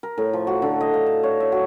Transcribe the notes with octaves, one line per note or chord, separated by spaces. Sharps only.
A#4
A2
F3
F#4
D3
D#5
F5
A5
C#5
E5
F#4